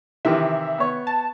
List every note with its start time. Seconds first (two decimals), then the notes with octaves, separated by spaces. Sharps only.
0.25 C3 D#3 E3 E5
0.78 B3 C#5
1.07 A5